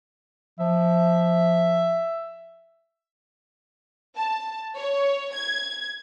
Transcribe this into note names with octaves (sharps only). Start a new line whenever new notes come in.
F3 E5
A5
C#5
G#6